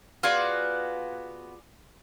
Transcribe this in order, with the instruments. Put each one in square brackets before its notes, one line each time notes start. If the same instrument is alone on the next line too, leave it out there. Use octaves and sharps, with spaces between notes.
[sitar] B3 F#4 [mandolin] F4 G#4 D5